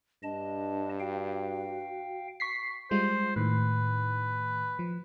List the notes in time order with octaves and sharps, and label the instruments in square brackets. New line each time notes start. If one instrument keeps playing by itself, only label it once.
[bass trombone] G2 [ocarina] D4 [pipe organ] D#5 A5
[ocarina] F#4 [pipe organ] F5 G5
[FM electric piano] C#6 B6 C7
[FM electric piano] G3 G#3 F4 [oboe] C5
[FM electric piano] A2 D#3 [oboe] B4
[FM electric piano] F3